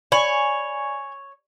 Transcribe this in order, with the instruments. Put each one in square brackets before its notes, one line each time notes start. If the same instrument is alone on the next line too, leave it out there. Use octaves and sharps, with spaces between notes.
[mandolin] C#5 [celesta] D5 B5 F#7 [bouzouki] G#5